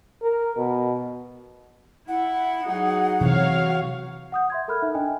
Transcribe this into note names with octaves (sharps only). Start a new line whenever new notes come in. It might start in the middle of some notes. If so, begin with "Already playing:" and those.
A#4
B2
E4 F#5
F#3 D#4 G#4
C3 E3 F#3 C#5 F5
F#5 D#6 G6
E5 C6 G#6
A4 A#4 B5 F6 F#6
D#4 E5
D4 D#5 G5 G#5